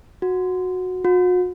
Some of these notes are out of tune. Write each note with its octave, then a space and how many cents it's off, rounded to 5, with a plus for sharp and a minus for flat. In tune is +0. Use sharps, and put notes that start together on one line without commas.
F#4 -10
F#4 -40